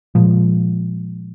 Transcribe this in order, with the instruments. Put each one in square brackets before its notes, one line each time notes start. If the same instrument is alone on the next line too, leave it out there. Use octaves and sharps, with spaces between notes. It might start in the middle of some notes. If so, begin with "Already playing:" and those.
[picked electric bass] A#2 F3 G#3